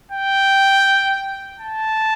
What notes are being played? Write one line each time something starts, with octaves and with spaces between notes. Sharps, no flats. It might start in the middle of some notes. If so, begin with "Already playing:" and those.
G5
A5